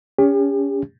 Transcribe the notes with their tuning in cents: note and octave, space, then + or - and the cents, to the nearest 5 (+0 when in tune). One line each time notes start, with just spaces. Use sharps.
C#4 +25 G4 +40